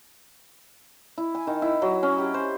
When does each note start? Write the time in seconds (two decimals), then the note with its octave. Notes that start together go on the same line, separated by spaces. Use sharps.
1.18 E4
1.35 G#5
1.47 D#3
1.62 E4
1.82 F#3
2.03 C#4
2.18 G4
2.34 C5